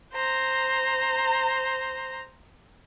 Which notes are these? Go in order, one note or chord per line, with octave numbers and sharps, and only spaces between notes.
C5 A#5